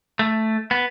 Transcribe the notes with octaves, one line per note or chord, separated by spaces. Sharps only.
A3
B3